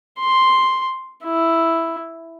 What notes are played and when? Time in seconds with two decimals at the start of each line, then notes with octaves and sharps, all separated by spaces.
0.19 C6
1.24 E4